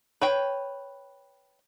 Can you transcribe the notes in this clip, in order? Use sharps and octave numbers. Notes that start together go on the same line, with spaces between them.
B4 C#5 G5